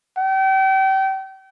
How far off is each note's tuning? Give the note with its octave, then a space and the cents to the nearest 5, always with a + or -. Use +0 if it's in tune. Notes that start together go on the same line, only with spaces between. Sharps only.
G5 -35